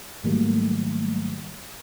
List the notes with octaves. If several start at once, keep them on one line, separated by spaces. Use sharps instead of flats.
G#2 D#3 F#3 G3 A3 A#3